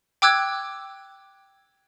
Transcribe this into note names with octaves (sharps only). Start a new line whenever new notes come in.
G5 D6 E6 F#6 G#6